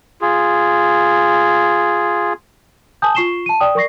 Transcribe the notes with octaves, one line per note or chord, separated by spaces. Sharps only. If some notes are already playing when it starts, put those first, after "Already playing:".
F4 G#4
G#5 A5 D#6 G6
F4 C#6 C7 E7 G7
A5 D#7
D5 G5 D#6
A#4 D5 C#6 A#6 C7